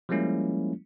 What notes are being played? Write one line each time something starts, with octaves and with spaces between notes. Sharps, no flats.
F3 G3 G#3 A#3 C#4 E4